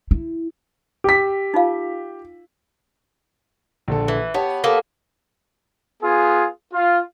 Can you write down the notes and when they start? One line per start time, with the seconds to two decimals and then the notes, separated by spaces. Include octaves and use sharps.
0.11 E4
1.04 G4 B6
1.54 D#4 F4 F5
3.88 A#1 D3 A4
4.08 E3
4.34 B3 G4 C#5 A5
4.64 A#3 B3 A4
6.02 B3 F4 G#4
6.73 F4